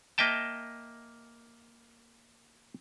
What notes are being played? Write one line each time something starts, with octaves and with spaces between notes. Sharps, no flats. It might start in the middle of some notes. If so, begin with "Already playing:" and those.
A#3 D#5 E5 G5 A5